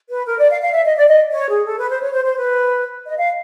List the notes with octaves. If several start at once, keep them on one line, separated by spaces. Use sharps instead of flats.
B4
A#4
D5
F5
F5
E5
D#5
D5
D#5
C#5
G#4
A4
B4
C5
C#5
C5
C5
B4
D#5
F5